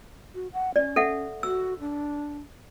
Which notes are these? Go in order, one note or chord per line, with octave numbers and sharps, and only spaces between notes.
F#4
F#5
C#4 D5
A4 E5 F#5
F#4 E6
D4